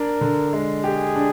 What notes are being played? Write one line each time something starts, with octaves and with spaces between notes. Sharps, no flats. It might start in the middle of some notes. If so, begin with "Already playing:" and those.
Already playing: D4 A#4
D3
G#3
G4 G#4
D4